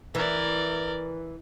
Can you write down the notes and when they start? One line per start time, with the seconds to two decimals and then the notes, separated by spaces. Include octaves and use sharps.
0.15 E3 A#4 D5